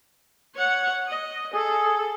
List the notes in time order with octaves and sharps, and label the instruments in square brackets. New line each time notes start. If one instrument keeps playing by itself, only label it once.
[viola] C#5 F#5
D#5
[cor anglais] G#4 [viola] A4